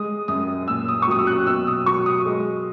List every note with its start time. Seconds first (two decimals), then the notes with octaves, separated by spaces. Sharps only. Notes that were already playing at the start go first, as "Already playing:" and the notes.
Already playing: G#3 D#6
0.28 F#2 D#6
0.68 A#2 E6
0.88 D#6
1.02 C#6
1.07 F#3 D#6
1.19 E6
1.27 F#6
1.47 B2 E6
1.67 D#6
1.86 F#3 C#6
2.06 D#6
2.25 G#3